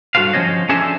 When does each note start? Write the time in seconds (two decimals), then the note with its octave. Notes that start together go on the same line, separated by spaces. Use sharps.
0.15 G2 F#4 A4 C5 F5
0.34 F3 C4 C#4 C5 C#5 D#5
0.69 C#4 D4 G#4 A4 C5 E5